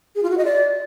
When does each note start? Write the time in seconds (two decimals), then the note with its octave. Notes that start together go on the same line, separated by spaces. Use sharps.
0.15 G#4
0.23 F4
0.30 F#4
0.38 D#5
0.45 D5